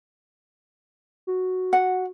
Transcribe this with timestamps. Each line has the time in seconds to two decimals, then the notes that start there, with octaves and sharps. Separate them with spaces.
1.27 F#4
1.73 F#5